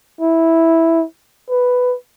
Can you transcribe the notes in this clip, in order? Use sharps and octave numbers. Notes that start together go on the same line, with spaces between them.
E4
B4